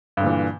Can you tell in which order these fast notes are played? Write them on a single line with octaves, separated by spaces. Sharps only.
G2 D3 A#2 E3